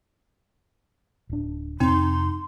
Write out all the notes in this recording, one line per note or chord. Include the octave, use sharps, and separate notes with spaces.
D1 D4
F2 C3 C4 D#4 C6